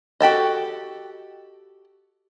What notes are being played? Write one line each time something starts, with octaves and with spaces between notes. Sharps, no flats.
F#4 G4 A4 D#5